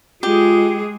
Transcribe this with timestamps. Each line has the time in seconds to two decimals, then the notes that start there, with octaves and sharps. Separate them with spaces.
0.23 G#3 F4 G4 G#4